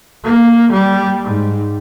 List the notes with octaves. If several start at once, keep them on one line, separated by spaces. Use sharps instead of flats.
A#3
G3
G#2